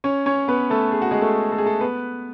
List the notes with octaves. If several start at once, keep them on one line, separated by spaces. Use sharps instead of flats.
C#4 C#5
C#4 C#5
B3 B4
A3 A4
G#4
F#4
G#3 G#4
A3 A4
A4
G#4
A3 A4
B3 B4